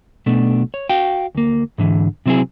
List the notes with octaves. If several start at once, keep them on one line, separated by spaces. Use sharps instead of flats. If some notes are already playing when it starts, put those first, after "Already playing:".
B1 B2 A3 D4
C#5
F#4 F5 G5
D2 A#3
G#2 D3 E3
C3 F#3 C4 E4 G#4